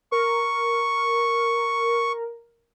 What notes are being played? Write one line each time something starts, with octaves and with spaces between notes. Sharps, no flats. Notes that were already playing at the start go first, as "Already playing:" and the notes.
A#4 C#6